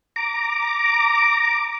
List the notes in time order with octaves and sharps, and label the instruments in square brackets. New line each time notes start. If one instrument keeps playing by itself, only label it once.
[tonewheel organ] A#5 D6